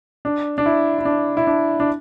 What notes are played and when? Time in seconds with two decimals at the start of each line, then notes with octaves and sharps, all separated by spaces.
0.25 D4
0.58 D4
0.66 E4
0.99 E4
1.05 D4
1.37 E4
1.47 D4
1.80 D4